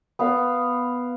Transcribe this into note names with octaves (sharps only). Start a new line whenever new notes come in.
B3 F5 B5